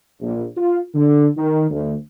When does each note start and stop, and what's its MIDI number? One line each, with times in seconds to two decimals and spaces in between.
0.21 0.43 34
0.57 0.80 65
0.95 1.26 50
1.37 1.66 51
1.70 1.94 38